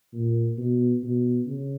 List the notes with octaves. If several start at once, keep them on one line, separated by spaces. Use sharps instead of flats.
A#2
B2
B2
C#3